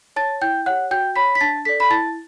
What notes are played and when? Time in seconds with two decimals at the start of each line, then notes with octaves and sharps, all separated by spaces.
0.16 C#5 A5 A6
0.41 E4 G5 G6
0.66 G4 C#5 F#5 F#6
0.91 F#4 G5 G6
1.16 C#5 B5 B6
1.35 B6
1.41 D4 A5 A6
1.65 A4 D5 B6
1.80 B5 B6
1.90 E4 A5 A6